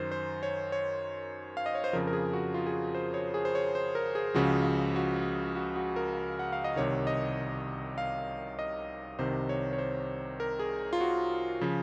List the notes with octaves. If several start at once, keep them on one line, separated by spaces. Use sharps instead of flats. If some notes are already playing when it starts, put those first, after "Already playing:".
Already playing: F#2 D#3 C5
C5
C#5
C#5
F5
D#5
C#5
C5
F2 C#3 F3 A#4
A#4
G#4
F#4
F4
G#4
F#4
C5
C#5
G#4
C5
C#5
C5
A#4
G#4
C#2 C#3 F3 F#4
F#4
F#4
F#4
A#4
F#5
F5
D#5
C2 C3 D#3 C#5
D#5
F5
D#5
C2 C3 D#3 C5
C#5
C#5
C5
A#4
G#4
F4
F#4
C#3 F3